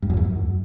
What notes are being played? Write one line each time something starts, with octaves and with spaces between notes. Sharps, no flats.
G2
F#2
E2
F#2